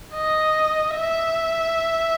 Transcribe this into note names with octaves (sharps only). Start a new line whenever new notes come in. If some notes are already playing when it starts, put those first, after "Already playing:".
D#5
E5